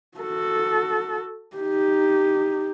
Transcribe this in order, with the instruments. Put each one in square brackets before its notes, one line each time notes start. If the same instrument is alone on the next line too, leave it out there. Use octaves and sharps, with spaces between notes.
[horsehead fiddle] F#4 A4
D#4 G4